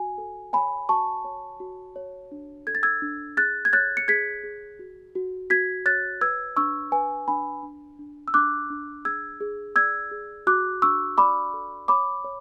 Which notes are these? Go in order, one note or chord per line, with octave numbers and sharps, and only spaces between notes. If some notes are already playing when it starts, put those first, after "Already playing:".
Already playing: F#4 G#5
A4
C#5 G#5 B5
F#4 A5 C#6
C#5
F#4
C#5
D4
A4 G#6
A6
E6 G#6
D4
G#4 F#6 A6
G#6
C#5 F#6 A6
C#7
G#4 G#6 B6
G#4
F#4
F#4
F#4 G#6 B6
C#5 F#6 A6
B4 E6 G#6
D4 C#6 E6
B4 G#5
D4 G#5 B5
D4
D4
E6
D4 D6 F#6
D4
G#4 E6 G#6
G#4
D5 E6 G#6
G#4
F#4 D6 F#6
D4 C#6 E6
D5 B5 D6
A4
C#5 B5 D6
C#5